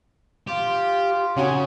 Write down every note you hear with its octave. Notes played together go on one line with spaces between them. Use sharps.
F4 G4
C#3 C#4 F#4 G#5